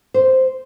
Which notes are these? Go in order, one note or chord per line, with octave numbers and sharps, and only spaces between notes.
C5